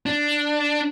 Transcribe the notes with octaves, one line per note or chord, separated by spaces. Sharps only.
D4